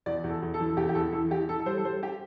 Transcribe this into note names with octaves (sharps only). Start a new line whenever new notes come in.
E2 D5
E2
A4
E2
A4
E3
A4
E2 G4
G4
E2 A4
E3 A4
E3 G4
E3 A4
A4
G3 C5
A4
G3 C5
G4